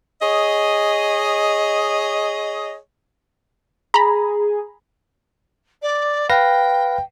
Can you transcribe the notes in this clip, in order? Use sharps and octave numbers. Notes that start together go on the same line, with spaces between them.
G#4 C#5 D#5
G#4 A#5 B5
D5
B4 F5 G5 A#6